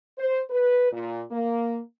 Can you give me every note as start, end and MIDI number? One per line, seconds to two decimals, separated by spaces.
0.18 0.39 72
0.50 0.89 71
0.92 1.22 46
1.31 1.80 58